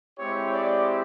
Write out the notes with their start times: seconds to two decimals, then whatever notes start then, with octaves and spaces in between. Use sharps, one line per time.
0.18 G#3 C4 E4 G4 C#5
0.54 D5